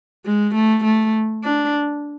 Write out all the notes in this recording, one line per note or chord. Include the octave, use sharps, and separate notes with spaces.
G#3
A3
A3
D4